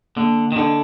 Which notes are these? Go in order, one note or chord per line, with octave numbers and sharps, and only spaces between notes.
D3 A#3
D#3
D3 D4 A4 D#5